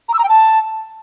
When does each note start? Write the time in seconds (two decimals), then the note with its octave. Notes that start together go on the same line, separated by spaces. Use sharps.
0.08 A#5
0.14 E6
0.19 A#5
0.24 G5
0.29 A5